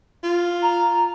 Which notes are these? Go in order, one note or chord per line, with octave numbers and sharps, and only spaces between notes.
F4
A#5